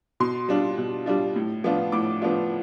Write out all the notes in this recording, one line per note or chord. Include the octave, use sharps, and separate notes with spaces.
B2 C6
G3 D4 F4
B2
G3 D4 F4
A2
F3 B3 D4 F4
A2 D6
F3 B3 D4 F4